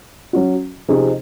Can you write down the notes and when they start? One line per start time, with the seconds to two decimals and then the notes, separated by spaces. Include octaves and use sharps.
0.33 F#3 C#4 F#4
0.88 C3 F3 C4 D#4 G#4